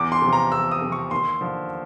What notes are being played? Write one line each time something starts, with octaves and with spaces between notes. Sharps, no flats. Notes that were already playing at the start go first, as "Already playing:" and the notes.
Already playing: E2 D6
C6
C3 F3
A#5
E2 E6
D#6
C3 F3
C#6
D#2 C6
D3 F3